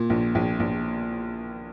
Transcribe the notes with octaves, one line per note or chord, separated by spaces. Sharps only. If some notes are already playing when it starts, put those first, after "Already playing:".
Already playing: A#2
A#1
A#1
A#1